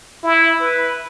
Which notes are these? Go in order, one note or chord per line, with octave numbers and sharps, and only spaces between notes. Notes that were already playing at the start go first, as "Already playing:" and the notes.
E4
B4